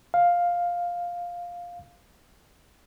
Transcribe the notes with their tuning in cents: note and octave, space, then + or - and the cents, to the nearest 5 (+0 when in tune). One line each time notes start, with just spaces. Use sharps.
F5 +5